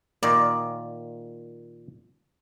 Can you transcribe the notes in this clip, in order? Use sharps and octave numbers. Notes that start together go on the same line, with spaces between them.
A#2 D#3 A#3 D5